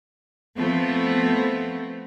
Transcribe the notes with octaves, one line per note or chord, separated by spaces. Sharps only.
F3 A3 B3 C4